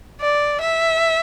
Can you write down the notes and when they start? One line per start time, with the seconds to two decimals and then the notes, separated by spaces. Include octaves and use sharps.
0.21 D5
0.61 E5